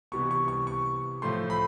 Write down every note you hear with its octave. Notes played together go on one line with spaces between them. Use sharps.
C3 E3 G3 B3 C#6
C#6
C#6
C#6
A2 F3 A3 C6
B5